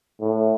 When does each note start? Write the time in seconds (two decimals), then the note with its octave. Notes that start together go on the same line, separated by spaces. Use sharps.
0.21 A2